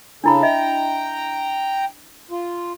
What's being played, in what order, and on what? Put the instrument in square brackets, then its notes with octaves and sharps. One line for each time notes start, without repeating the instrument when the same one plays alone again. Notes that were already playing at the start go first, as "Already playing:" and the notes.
[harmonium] C#3 A4 [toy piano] D4 E4 B5
[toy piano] D#5 E5 [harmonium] G5 A#5
[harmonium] F4